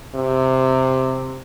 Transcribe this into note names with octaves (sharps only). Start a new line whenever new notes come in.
C3